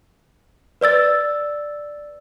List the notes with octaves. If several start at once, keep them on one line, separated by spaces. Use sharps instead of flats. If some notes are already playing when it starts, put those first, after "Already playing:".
B4 D5 E6 A6